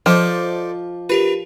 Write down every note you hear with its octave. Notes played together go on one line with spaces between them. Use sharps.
F3 A4 C5 D5 D#5 D6
F4 G4 A#4 B4